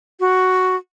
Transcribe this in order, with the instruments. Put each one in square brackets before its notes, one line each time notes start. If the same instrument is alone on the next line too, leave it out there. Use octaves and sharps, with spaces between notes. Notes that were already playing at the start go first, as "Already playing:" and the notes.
[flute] F#4